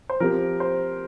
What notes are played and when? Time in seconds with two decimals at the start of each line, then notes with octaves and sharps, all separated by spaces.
0.10 C5
0.20 F3 C4 G4 A#4
0.60 C5